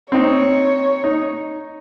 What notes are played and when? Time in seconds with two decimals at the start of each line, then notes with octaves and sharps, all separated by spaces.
0.12 C4 D#4 C#5
1.04 D#4